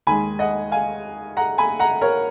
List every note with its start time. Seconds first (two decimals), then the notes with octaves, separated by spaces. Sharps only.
0.07 D#2 D#3 G#3 G#5 B5
0.39 D#5 F#5
0.71 F5 G#5
1.37 F#5 A#5
1.58 G#5 B5
1.79 F#5 A#5
2.01 A#4 C#5